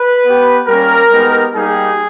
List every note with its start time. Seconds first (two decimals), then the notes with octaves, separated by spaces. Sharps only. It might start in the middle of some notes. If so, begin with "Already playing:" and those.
Already playing: B4
0.24 B3 G4
0.68 G3 A#3 C#4 G4 A#4
1.11 G#3 B3 D#4 G4
1.55 G3 A#3 D#4 G4 G#4